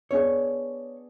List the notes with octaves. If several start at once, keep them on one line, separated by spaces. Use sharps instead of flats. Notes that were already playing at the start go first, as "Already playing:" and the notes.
B3 D4 G#4 C#5 D5